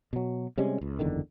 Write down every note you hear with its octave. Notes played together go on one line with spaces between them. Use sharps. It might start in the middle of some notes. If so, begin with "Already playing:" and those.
B2 F#3
C3 G3 G#3 C#4
C#2
F#1 E2 D3 D#3